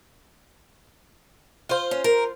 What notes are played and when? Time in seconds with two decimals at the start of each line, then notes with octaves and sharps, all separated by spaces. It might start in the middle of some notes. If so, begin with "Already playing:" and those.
1.69 F4 C5
1.91 C#4
2.04 A#4